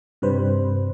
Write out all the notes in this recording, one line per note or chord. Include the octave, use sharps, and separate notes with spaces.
G2 C3 G3 B4 C5